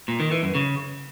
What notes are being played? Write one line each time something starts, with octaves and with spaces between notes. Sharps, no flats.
A#2
D#3
E3
F#2
C#3